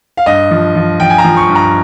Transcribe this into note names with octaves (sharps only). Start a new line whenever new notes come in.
F5
G2 D#5
F3
F3
F3 G5
G#5
A#5
F3
C#6
G2
A#5